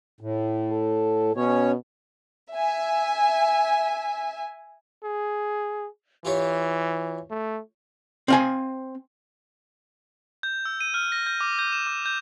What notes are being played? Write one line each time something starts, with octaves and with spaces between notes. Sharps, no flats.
A2
A4
B2 C#4 C#5
E5 G#5
G#4
E3 F4 G4 C#5
A3
C4 F5 G#5
G6
E6
D#7
F6
A#6
G6
D6
G6
E7
D6
G6